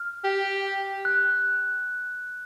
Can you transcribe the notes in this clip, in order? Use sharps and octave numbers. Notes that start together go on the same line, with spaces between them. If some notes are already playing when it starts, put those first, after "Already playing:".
Already playing: F6
G4
F#6